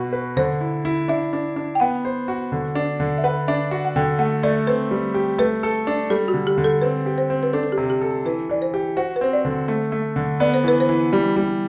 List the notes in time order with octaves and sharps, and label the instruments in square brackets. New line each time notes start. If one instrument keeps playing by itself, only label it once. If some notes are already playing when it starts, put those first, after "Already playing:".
Already playing: [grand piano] B2 F#4 B4
B4
[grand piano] D3 [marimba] C5
[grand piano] E4
E4
[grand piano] D4 [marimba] E5
[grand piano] D4
D4
[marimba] G5
[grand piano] B3 [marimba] F#5
[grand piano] C5
F#4
D3
D4
D3
[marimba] E5
[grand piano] B4 [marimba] F#5
[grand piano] D4 [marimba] E5
[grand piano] F#4 [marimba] F#5
[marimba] F#5
[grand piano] D3 [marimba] G5
[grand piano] A3 [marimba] F#5
[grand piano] A3 [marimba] D5
[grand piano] C4 [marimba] B4
[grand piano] G3
G4
[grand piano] A3 [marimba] B4
[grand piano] A4
D4
[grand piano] G3 [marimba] A4
[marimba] F#4
[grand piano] D3
[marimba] G4
[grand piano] D3
[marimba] A4
[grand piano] C4 [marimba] B4
[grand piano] G4
[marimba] C5
[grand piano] C4
[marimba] B4
[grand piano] D4 [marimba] A4
[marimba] A4
G4
[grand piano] C3
[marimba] G4
[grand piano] A4
[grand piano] E3 [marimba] B4
[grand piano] E3 [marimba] D5
[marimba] C5
[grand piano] G4
[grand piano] F#4 [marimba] C5
[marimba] B4
[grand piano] C4 [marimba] C5
[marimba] D5
[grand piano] D3
A3
A3
D3
[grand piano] B3 [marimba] D5
[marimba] C5
[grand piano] E3 [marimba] B4
[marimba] C5
[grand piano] E3
G3
G3